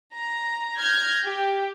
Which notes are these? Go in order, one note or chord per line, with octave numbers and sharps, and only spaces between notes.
A#5
F6 G6 G#6 A#6
G4